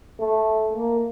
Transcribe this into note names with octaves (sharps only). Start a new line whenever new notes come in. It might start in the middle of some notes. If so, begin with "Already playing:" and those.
A3
A#3